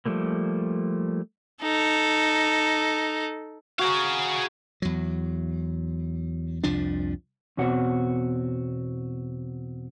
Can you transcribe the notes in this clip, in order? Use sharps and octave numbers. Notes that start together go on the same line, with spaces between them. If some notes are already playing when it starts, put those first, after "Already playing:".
F3 G3 A3 A#3
D#4 A4
F#4 G#4 F5 A#5
E2 F#3
C2 F2 F3 D4
E2 B2 C4 F#4 C#5 F#5